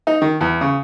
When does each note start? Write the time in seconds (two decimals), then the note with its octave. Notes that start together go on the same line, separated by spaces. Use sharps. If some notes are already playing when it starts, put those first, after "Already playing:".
0.07 D#4
0.22 D#3
0.41 E2
0.61 C#3